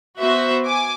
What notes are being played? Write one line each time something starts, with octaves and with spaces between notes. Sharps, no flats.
B3 F#4 C5 E5
G#5 D6